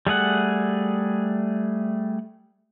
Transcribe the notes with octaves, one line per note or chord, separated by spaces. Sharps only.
G3 A3 G#4 F#5